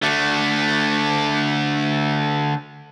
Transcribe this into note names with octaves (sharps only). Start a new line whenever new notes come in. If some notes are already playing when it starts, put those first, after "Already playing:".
D3 A3